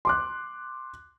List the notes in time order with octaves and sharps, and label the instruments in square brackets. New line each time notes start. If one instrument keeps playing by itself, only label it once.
[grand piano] C6 D6 F#6